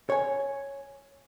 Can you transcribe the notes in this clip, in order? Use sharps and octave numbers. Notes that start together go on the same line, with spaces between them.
C#5 G#5